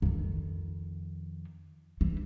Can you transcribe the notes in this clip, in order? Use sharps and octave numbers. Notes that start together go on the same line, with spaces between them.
F2 D#3
E3